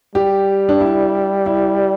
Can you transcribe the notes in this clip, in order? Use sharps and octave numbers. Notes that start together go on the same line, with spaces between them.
G3 G4
D4
E4
E4